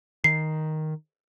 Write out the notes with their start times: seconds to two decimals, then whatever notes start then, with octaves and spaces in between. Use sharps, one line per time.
0.24 D#3 C7